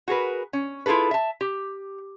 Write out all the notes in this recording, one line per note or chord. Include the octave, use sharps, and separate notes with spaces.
F#4 G#4 A#4 B4
C#4
E4 F4 G#4 A4 B4
E5 A5
G4